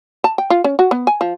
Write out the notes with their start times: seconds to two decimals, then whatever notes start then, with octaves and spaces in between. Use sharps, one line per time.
0.24 A5
0.38 G5
0.50 F4
0.64 C#4
0.79 F#4
0.91 B3
1.07 G#5
1.21 F3